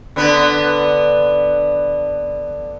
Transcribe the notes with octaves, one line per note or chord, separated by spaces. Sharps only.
D3 B3 B4